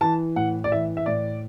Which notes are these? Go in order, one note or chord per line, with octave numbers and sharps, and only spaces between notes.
E3 A5
A2 F#5
D5
E3 E5
E5
A2 D5